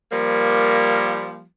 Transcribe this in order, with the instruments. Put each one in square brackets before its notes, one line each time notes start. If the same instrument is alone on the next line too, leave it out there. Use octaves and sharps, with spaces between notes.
[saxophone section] F3 G3 A#3